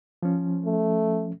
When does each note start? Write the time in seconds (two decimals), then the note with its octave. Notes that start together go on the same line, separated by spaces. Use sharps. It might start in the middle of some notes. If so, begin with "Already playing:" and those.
0.23 F3 C#4
0.65 A3